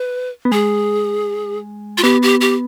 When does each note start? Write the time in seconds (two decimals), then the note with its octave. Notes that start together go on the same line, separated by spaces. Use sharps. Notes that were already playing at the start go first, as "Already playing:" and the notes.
Already playing: B4
0.45 B3
0.52 G#3 G#4
1.98 F4
2.03 B3 G4
2.22 G4
2.41 G4